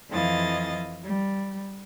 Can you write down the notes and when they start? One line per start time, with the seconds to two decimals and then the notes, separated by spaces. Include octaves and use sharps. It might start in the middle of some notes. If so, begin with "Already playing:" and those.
0.10 F2 E3 D#5 F5 A6
1.04 G3